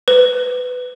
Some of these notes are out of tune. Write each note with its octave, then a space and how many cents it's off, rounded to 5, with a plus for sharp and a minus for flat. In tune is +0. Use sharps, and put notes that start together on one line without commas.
B4 +15